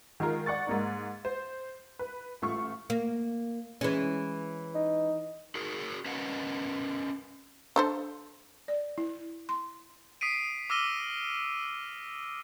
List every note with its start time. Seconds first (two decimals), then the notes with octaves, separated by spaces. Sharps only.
0.20 D#3 G#3 F4 A#4
0.46 D5 F#5 C#6 A6
0.67 G#2 A#3 D#4
1.25 C5
1.99 B4
2.42 A1 A3 F4 C#6
2.90 A#3
3.81 E3 G#3 C#4
4.75 D#4
5.55 F#4 G#4 A#4
6.05 C#4 A#4 B4 D#5 F5 F#5
7.76 D4 A4 C5
8.68 D5
8.98 E4
9.49 C6
10.21 D#6 B6 C7 D7 D#7
10.70 D6 E6 F6 A#6 D#7 G7